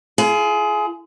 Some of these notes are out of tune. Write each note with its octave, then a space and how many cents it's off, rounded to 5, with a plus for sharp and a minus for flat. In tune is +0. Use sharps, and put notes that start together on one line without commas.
F4 -35 G#4 +25